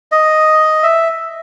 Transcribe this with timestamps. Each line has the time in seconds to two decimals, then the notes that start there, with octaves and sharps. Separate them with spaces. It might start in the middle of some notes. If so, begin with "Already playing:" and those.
0.12 D#5
0.83 E5